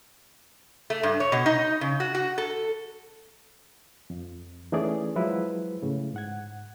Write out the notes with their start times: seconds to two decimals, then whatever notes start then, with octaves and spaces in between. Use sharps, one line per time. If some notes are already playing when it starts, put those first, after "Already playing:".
0.90 A3
1.03 G2
1.20 C#5
1.32 B2
1.46 D#4
1.81 C#3
2.00 F#4
2.15 F#4
2.38 A4
4.10 F2
4.72 E3 A3 C#4 D#4 G#4 D5
5.16 F3 F#3 G#3 E4 B4
5.83 A2 C#3
6.14 G#2 F#5 G#6